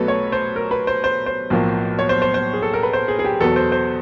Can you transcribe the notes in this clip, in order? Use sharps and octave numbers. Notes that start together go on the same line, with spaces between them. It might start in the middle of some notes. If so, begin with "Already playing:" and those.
Already playing: B1 B2 F#3 A3 A4 B4
C#5
C5
A#4
B4
C5
C5
C5
B1 A2 F3 A#3
C#5
C5
C5
C5
G#4
A4
A#4
B4
C5
G#4
G#4
G4
E2 B2 F#3 B3 A4
C5
C5